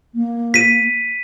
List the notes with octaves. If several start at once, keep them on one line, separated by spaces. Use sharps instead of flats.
A#3
B6 D#7